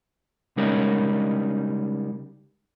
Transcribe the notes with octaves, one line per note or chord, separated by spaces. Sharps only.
C#3 G3 G#3 C#4 D#4 A#4